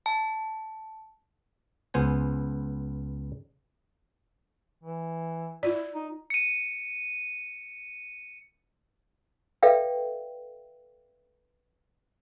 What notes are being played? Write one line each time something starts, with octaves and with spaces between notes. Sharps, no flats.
A5
C#2 B3 C5 G#5
E3
E4 F4 D5
D#4
C#7 D#7
A4 B4 D5 E5 F5 G5